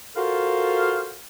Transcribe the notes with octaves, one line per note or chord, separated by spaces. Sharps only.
F4 F#4 A4 A#4 C5 F5